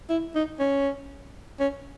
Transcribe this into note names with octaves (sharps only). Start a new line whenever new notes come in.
E4
D#4
C#4
C#4